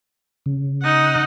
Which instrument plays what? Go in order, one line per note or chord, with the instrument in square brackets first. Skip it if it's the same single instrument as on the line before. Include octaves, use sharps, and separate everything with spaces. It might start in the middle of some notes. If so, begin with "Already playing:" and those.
[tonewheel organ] C#3
[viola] D#4 F#5